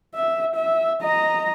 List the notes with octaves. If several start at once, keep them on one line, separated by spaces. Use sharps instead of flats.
E5
E5
D#5 A#5